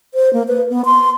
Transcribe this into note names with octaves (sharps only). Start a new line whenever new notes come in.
C5
A#3
B4
B3
C6